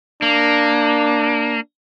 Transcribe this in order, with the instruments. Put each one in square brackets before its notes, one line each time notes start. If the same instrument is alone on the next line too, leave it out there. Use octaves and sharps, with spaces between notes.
[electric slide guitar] A#3 [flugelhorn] D4